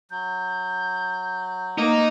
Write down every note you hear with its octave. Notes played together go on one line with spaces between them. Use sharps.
F#3 G6
A#3 D#4